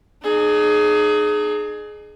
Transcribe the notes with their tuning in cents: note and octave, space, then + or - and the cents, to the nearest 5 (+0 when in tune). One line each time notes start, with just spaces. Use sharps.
D#4 -40 G#4 +20